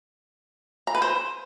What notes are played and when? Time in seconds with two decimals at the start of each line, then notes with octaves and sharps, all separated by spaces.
0.87 A#5
0.95 B4
1.02 C5